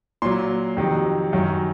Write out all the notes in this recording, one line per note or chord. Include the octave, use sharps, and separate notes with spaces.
A#2 F#3 C6
F2 C3 D#3 F#3
F#2 D#3 F#3